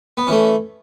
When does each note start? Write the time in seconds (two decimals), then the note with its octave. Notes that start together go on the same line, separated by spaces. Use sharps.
0.17 B3
0.27 E3 A3 C#4